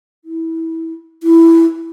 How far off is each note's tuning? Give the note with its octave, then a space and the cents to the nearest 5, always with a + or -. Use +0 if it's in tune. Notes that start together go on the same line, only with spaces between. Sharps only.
E4 -20
E4 +5